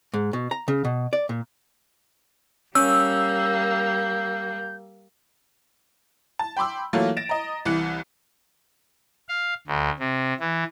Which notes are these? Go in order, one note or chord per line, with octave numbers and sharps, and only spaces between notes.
G#2
B2
A#5
C#3
B2
D5
A#2
G3 A#3 C#4 E6 G6
A5
G5 B5 C6 D6 E6
E3 F#3 A3 A#3 F4
A6 A#6 D7 E7
D#5 A#5
C2 E3 F#6 C#7
F5
D2
C3
E3